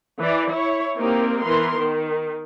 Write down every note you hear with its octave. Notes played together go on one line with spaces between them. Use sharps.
E3 D5
E4 C#5
A#3 C4 D#4 G4 A#4
E3 B3 A#4 C6
D#3